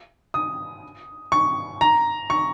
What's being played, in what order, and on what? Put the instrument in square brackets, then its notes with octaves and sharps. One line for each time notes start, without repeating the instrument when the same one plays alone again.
[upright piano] D#6
C#6
A#5
C#6